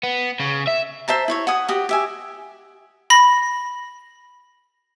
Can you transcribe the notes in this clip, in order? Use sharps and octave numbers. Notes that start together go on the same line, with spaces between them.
B3
C#3
E5
C5 E5 A5 A#5
E4 C#5 C#6
F#5 G#5 D#6
F#4 G4 D#6
G4 E5 G#5
B5 A#6